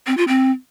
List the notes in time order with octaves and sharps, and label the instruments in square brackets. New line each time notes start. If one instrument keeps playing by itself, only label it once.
[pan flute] C4
F4
C4